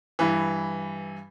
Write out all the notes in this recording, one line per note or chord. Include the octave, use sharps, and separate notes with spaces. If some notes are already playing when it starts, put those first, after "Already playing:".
G2 E3